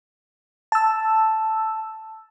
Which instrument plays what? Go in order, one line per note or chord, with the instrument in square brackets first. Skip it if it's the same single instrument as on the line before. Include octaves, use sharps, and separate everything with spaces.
[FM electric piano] A5 E6